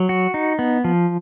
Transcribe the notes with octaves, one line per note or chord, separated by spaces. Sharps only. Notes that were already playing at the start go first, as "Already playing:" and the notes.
Already playing: F#3
F#4
D#4
B3
F3